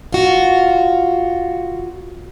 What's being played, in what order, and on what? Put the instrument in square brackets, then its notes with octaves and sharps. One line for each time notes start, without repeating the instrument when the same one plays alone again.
[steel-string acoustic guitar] F4 F#4